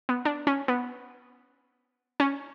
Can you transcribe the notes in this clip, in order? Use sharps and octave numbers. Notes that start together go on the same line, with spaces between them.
B3
D4
C#4
B3
C#4